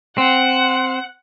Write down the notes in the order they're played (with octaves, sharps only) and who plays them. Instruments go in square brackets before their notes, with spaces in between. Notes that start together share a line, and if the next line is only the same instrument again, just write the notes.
[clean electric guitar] C4 [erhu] F#5